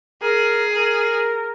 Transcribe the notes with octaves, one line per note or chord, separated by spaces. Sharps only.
G#4 A#4
A#4